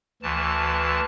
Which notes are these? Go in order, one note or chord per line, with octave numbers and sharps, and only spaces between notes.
D2 E3 A5